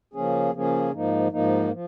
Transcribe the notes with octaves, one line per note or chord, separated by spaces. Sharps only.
C#3 F3 A#3 C#4 G#4
C#3 F3 A#3 C#4 G#4
G#2 F3 A#3 D#4
G#2 F3 A#3 D#4
F3